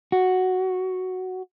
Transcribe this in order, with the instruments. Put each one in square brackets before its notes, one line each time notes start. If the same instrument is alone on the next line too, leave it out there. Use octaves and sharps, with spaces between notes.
[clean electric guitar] F#4